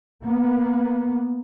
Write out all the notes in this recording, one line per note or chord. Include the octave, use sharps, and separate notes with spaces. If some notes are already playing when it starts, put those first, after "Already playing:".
A#3 B3